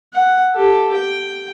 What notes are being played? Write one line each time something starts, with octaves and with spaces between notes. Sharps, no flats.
F#5
G4 A4
G5